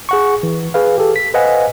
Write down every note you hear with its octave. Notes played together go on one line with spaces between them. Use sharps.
G#4 F#5 C#6
E3
G#4 B4 F5
G4 A4
B6
B4 C5 D#5 F5 F#5 G#5